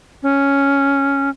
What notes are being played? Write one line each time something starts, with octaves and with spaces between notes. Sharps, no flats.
C#4